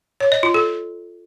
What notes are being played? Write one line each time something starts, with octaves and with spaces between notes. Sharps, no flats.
C#5
D#5
F4
A4